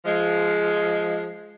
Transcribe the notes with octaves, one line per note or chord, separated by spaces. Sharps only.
F3 G#3